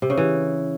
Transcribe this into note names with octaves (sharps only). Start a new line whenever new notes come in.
C3
C#3
E3